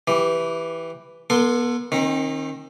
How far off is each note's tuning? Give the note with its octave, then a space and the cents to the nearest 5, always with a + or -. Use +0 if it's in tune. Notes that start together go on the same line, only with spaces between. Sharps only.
E3 +0 G4 +0
B3 -35 A4 +25 C6 +0
D#3 +0 C4 +45